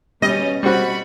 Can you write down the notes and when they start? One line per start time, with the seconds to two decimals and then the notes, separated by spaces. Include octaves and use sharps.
0.22 B2 G3 C#4 D#5
0.63 G3 C4 F#4 B5 C#6